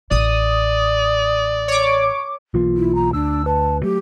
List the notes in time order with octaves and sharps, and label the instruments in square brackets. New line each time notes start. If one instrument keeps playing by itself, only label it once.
[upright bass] A1 [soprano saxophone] D5 [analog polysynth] D#6
[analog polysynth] C#5 D6
[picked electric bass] B1 E3 A#3 [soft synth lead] F4
[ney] E4
A#5
[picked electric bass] D2 [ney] D4 [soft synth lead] E6
[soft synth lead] B4 [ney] A5
[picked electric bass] F#3 A3 [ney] G4